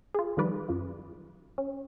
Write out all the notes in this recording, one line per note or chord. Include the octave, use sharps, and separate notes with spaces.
F4 G#4
D#3 F3 G3 B4 D5
F#2 F3
C#4